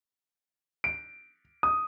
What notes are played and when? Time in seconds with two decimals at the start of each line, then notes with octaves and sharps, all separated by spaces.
0.84 D7
1.63 D#6